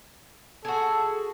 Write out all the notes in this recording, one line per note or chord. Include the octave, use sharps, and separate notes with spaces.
F#4 G#4 A4